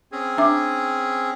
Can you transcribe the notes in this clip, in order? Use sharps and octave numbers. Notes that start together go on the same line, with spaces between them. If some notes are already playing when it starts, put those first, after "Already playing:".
C4 C#4 G#4
D4 E5 D6